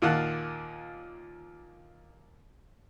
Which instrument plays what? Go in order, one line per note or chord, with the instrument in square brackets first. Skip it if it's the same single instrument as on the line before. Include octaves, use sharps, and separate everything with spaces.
[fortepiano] D#2 A#2 D#3 F4 F#5 A5